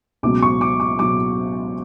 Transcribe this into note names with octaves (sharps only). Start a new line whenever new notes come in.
C#2 B2 F#3 D6
C#6
D6
D6
B2 F#3 D6